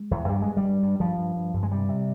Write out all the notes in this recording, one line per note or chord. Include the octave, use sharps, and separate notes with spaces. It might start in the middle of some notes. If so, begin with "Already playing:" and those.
Already playing: G#3
E2
G2 G3
G2 G#3
G3
G2
G2
G2 F3
G2
G2
G2
G#3
C3 G3
C3